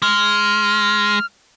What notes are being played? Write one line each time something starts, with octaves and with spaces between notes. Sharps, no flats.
G#3 F6